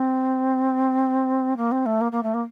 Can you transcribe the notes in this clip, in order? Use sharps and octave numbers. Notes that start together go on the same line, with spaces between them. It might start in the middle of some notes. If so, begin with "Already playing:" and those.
Already playing: C4
A#3
C4
A3
A#3
A#3
A3
A#3